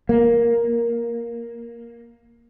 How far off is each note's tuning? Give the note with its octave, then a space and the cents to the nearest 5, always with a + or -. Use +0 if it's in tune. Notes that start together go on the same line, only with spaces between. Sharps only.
A#3 +5